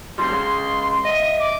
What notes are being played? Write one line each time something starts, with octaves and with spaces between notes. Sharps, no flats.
C3 F3 G3 C6
C#3 G#3
C6
D#5 E5 D#7
D6